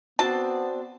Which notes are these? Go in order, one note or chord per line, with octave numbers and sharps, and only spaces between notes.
B3 C4 D4 F#4 C5 A5